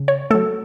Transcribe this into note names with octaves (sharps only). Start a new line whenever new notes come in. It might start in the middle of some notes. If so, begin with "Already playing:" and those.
Already playing: C#3
C#5
F#3 A3 A4